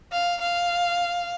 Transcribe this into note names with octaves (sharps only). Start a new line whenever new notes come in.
F5
F5